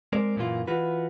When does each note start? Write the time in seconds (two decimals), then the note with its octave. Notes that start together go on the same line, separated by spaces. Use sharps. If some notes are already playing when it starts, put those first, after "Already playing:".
0.13 G#3 C4 A#4 D5
0.36 F#2 A#2 E3 A#3 F4
0.67 E3 F4 F#4 B4